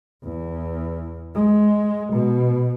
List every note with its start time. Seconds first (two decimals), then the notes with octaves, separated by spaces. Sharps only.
0.24 E2
1.35 G#3
2.13 B2